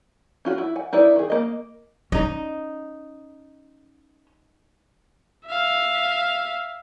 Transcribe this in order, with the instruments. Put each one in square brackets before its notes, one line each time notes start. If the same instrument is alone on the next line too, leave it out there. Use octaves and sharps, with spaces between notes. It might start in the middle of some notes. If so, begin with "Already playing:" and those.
[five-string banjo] C#4 F4 F#4
E4
F#5 G#5
D#4 E4 B4 D5
D#3 G#4
A#3 D#5
[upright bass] C#4 [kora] D#4 D#5
[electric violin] E5 F5